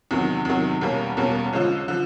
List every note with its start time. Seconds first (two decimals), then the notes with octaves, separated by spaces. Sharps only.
0.11 E2 C3 D#3 F#3
0.45 E2 C3 D#3 F#3
0.81 E2 B2 G3 A#3 C#4
1.17 E2 B2 G3 A#3 C#4
1.53 D3 F3 G#3 C#4
1.88 D3 F3